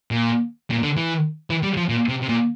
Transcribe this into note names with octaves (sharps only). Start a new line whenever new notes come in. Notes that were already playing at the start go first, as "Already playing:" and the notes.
A#2
A#2
D3
E3
E3
G3
F3
A#2
C3
C3
A#2